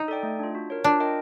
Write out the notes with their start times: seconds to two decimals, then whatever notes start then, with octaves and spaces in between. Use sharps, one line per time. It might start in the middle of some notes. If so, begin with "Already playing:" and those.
Already playing: D#4
0.08 A4 D5 G5
0.23 A3
0.39 D4 F4
0.55 F#4
0.70 A#4 C#5
0.84 D4 F4
1.00 A#4 D#5 G5